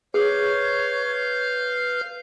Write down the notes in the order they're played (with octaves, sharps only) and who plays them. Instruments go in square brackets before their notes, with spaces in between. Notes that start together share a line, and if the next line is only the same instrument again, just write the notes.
[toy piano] G#4 D6 [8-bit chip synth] B4 [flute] C#5 [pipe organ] F5 F6 G6